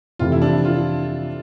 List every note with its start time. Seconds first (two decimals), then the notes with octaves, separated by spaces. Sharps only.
0.19 F2 C3 E3 A3 F4
0.32 E4
0.42 D4
0.64 F4